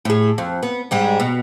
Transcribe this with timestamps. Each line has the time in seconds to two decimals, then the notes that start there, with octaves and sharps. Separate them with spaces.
0.05 A2 G#4
0.38 F2
0.63 B3
0.91 G#2 G3 G#3
1.20 B2